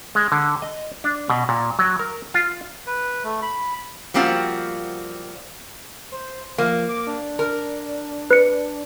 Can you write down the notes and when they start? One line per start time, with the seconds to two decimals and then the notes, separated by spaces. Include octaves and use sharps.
0.15 G#3
0.32 D3
0.62 D#5
1.04 D4
1.30 B2
1.49 A#2
1.79 F#3
1.99 A#4
2.34 F4
2.87 B4
3.24 A3
3.42 B5
4.14 F3 G3 A#3 C4 F4 F#4
6.12 C5
6.58 F3 A#3
6.89 D6
7.07 D4
7.39 A#4
8.31 B4 C#7